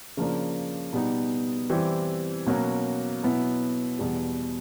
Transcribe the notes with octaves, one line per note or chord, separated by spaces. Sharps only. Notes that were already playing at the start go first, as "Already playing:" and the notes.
C#3 F3 A#3 D4
B2 G3 B3 D#4
E3 G3 C4 E4 G4
B2 F#3 A#3 C#4 F#4
B2 F#3 B3 E4
E2 B2 G3